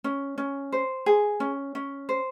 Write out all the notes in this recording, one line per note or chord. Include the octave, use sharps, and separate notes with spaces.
C#4
C#4
C5
G#4
C#4
C#4
C5